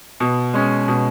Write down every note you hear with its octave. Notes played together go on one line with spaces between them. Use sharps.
B2
G#3 C#4
B2